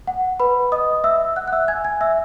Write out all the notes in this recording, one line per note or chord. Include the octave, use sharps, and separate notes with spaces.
F#5
B4 B5
D#5 D#6
E5 E6
F#5 F#6
F#6
E5 E6
G#5 G#6
G#5 G#6
E5 E6